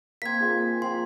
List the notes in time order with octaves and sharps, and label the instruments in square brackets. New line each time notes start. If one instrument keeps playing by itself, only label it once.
[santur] A#3 C4 [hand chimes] G#6 B6
[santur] A#3 F4 G#4
[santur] F3 C4 G#5 [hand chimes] C6